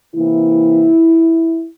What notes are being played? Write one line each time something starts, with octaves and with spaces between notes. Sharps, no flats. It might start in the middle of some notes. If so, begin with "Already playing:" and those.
C3 E3 A#3 E4